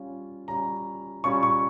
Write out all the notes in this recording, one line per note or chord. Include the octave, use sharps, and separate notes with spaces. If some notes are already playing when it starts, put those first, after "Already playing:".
Already playing: G3 C#4 F4
G3 C#4 F4 A#5
G3 C#4 F4 C#6
C#6